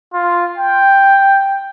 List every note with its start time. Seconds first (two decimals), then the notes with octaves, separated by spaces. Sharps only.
0.14 F4
0.58 G5